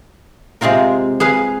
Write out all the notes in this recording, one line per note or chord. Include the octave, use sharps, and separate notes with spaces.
C3 G#3 C4 F4 A#4
G#4 B4 F5